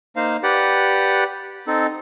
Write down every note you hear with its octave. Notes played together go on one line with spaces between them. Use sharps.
A#3 D#4 C5 F5
G4 B4 D5 F#5
C4 D#4 A4